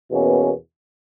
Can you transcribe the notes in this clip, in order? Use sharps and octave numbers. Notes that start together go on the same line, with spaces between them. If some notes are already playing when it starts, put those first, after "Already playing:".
E2 B2 A#3 C#4